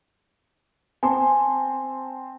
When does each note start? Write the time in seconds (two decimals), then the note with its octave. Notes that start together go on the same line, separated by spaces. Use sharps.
1.03 C4 G#5 A5 C6